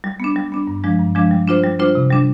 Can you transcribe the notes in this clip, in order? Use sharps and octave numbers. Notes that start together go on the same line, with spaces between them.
G3
B3 D4
G3
B3 D4
G2
F3 G#3 D4
G2
F3 G#3 D4
G3
D4 F4 C5
G3
D4 F4 C5
C3
G3 D4